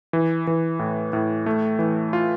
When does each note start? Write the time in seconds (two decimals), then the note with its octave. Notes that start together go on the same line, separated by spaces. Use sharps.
0.13 E3
0.47 E3
0.79 A2
1.13 A2
1.46 A3
1.79 E3
2.13 F4